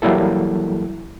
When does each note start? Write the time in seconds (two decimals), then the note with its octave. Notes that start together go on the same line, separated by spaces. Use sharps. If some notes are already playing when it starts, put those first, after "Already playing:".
0.02 E3 F#3 G3 A#3 E4 A4